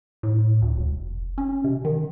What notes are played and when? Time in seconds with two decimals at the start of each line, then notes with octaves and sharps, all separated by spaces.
0.23 A2
0.62 D2
0.78 F1
1.38 C#4
1.64 C3
1.85 D#3